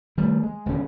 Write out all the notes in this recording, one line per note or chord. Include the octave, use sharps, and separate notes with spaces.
D#3 G3 A3
G#3
D#1 D3 C#4